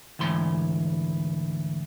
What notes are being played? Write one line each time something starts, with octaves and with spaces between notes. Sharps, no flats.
D2 G#2 E3 C6